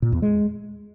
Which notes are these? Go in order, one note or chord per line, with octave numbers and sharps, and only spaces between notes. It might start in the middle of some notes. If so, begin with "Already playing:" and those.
A#2
E2
G#3